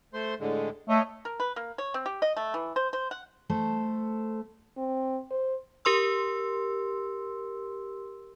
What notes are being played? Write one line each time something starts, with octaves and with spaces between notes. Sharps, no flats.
A3 C5 C6
A2 D3 G#3
A3 C#5 D#5
A#4
B4
A#3
C#5
C4
G4
D#5
A3
E3
C5
C5
F#5
A3 A4 C5
C4
C5
G4 A#4 C6 E6